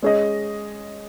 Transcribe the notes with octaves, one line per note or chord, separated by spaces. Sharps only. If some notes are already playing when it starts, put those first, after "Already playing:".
G#3 C#4 G#4 D#5